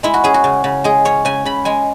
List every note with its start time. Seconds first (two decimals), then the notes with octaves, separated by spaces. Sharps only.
0.03 G#3 E4
0.14 F#4
0.24 C#4 G#4
0.34 F#4
0.44 C#3
0.64 C#3
0.84 G#3 G#4
1.05 C#4 C#5
1.25 C#3 G#5
1.45 C#3 B5
1.65 G#3 G#5